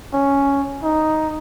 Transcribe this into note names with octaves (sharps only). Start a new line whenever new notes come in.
C#4
D#4